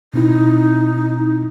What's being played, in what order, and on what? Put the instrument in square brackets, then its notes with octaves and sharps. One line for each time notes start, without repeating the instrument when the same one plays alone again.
[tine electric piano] B2 C4 E4 [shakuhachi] D#4